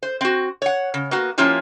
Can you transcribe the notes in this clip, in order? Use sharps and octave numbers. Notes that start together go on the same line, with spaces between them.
C5
C4 F#4
C#5 F#5
C#3
A#3 B3 F#4
F3 A#3 C#4 E4 F4 G4